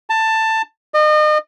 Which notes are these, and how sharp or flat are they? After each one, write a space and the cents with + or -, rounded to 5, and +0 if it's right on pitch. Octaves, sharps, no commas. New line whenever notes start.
A5 +15
D#5 -35